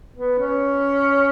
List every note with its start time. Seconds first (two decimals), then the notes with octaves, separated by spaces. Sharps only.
0.16 B3
0.39 C#4